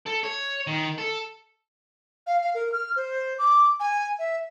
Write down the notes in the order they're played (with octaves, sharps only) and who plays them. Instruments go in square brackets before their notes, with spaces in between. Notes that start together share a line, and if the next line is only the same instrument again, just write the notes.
[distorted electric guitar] A4
C#5
D#3
A4
[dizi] F5
F5
A#4
F6
C5
D6
G#5
E5